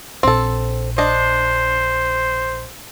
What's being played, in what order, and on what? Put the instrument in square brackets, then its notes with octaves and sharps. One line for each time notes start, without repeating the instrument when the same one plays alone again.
[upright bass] A#1 [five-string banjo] C4 A4
[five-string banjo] D4 D#5 [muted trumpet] C5